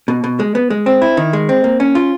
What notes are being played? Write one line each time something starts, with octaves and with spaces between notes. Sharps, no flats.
B2
B2
G#3
B3
G#3
C4
E4
D#3
G#3
C4
A#3
C#4
F4